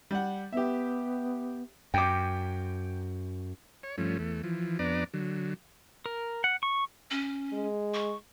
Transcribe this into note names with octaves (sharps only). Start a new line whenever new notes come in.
G3 F#5
B3 G4 E5
F#2 G5 D6
C#5
G2 F3 A3 C#4
E2 A3
E3 F3
F2 B3 D4 D5 A#5
D3 F#3
A#4
F#5
C#6
C#4
G#3
C#6